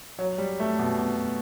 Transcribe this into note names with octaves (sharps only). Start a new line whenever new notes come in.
F#3
G3
A3
B2
B2